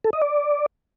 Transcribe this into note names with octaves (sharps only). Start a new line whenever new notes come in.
A4
D#5
D5